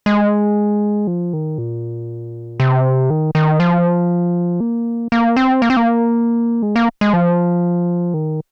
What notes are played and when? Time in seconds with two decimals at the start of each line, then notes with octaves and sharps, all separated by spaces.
0.06 G#3
1.07 F3
1.33 D#3
1.58 A#2
2.60 C3
3.10 D#3
3.35 D#3
3.60 F3
4.60 A#3
5.12 A#3
5.37 C4
5.62 A#3
5.70 C4
5.77 A#3
6.62 G#3
6.76 A#3
7.01 G#3
7.13 F3
8.14 D#3